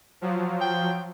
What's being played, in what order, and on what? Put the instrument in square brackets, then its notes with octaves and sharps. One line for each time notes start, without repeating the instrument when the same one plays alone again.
[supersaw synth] F3 F#3
[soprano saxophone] G5